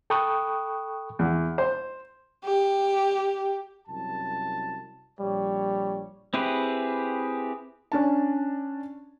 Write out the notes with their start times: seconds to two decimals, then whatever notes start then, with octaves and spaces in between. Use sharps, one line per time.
0.10 A4 G5 B5 C#6 D#6 F#6
1.19 E2
1.58 C5
2.45 G4
3.88 C2 F#2 A5
5.20 A#1 G3 C#5
6.34 C4 E4 G4 G#4 B4
7.92 C#4 D4 A5